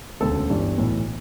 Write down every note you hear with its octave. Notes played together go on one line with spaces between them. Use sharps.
E1 D2 C#3 A4
G1 G2 E3
B1 A2 E3